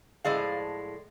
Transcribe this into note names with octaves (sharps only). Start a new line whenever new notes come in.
A2 F3 G#3 D5 F5